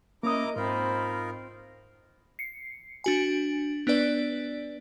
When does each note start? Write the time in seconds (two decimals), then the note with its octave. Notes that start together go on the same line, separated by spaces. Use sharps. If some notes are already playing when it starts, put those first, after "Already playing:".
0.23 A#3 C#4 E4 A#4 D#5 A#5 D6 D#6
0.56 G#2 C4 D#4 F4 A#4 B5
2.39 C7 C#7
3.04 D4 F#4 G#5
3.87 B3 D4 B4 D5